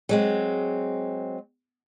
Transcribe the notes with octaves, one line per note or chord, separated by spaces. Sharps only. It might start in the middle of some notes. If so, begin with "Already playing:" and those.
F#3 G#3 C4